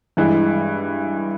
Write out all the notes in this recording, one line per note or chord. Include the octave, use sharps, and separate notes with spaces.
G2 E3 G#3